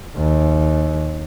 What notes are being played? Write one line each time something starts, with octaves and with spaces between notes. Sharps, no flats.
D#2